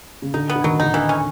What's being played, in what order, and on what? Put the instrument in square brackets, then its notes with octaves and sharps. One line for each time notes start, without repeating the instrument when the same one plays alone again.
[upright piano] C#3
[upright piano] D3 [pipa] D#4
[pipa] B3
[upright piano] D3
[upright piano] D#3 [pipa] F#3
[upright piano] D#3 [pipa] D#4
[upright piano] D3 [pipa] E3
[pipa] C#4